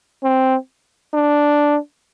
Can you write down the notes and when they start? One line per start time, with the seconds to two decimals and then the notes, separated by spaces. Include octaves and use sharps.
0.23 C4
1.13 D4